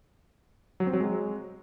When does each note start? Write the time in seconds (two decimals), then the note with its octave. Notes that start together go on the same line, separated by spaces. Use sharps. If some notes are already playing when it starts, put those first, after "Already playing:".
0.80 F#3
0.87 C4
0.93 F#3
1.00 G#3